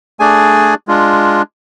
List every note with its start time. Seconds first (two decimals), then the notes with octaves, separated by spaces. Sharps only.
0.20 A3 D4 G#4 D5 G#5
0.88 G#3 D4 F4